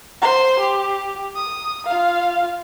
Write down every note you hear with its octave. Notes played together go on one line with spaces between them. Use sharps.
C5 C6
G4
D#6
F4 F5